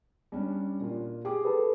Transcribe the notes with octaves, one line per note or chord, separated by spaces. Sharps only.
G3 C#4 D4
A#2 F4
G4 G#4 D6
A4 B4